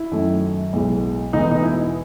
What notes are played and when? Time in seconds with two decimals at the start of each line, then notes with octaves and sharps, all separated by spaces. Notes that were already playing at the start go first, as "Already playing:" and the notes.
Already playing: E4
0.12 F#2 D#3 A3
0.73 B1 A2 G#3
1.33 E1 E2 B2 A3 D#4
1.51 D#4
1.63 E4